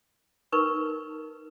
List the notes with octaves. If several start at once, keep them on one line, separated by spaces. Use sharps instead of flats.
D#4 A#4 B4 C#6